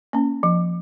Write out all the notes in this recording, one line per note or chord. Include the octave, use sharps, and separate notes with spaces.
A#3 C#4
F3